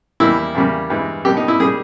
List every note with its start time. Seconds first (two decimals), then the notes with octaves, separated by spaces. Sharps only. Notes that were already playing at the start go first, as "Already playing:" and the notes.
0.20 E2 D#3 G3 A#3 E4
0.55 E2 C#3 G3 A#3
0.90 G2 E3 G#3
1.25 B2 G3 A#3 G4
1.37 D#4
1.48 E4
1.60 G3 A#3 G#4